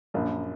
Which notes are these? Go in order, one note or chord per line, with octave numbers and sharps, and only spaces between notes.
A#1 F#2